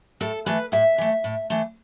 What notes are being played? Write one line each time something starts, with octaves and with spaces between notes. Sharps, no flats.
A2 A4
E3 A3 B4
A2 E5
E3 A3
A2
E3 A3